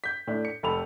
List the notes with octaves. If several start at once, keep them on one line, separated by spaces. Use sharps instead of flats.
G6 B6
A2 D4
C#7
F1 A4 B5 F7